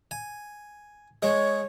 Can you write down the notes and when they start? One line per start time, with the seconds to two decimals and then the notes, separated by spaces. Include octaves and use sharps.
0.11 G#5
1.23 G#3 C#5